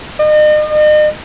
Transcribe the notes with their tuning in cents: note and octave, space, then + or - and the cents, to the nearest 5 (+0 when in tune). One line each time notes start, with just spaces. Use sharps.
D#5 -40